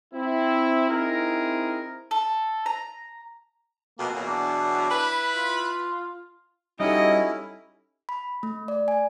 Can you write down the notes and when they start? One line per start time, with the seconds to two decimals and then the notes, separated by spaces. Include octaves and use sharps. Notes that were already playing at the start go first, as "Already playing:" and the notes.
0.14 C4 E4
0.89 C4 D#4 E4 G#4 A#4
2.11 A4
2.66 A#5
3.99 F2 B2 A#3
4.15 E2 B2 F#3
4.28 D4
4.90 E4 B4
5.36 F4
6.80 G3 C#4 D#4 E4 F#4 G4 A4 D#5
8.09 B5
8.43 A3
8.68 D5
8.88 G#5